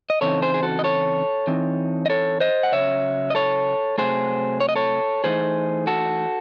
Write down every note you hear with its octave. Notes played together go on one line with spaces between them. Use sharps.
D#5
C#3 E3 C4 D#4 A4 C#5
G#4 C5
G#4
F#4 A4
D#5
A4 C#5
E3 C4 D#4
D#5
A4 C#5
C5 D#5
F#5
C#3 F#3 C#4 C#5 E5
D#5
A4 C#5
C3 F#3 A3 G#4 C5
C#5
D#5
A4 C#5
E3 A3 D#4 G#4 C5
F#4 A4